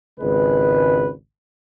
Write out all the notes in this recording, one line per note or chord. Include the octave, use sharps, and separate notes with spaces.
G#1 C#2 G#3 B4